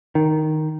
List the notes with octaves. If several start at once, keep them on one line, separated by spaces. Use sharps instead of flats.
D#3